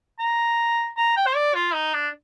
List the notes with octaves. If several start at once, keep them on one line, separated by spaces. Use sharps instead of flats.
A#5
A#5
G5
C5
D5
F4
D#4
D4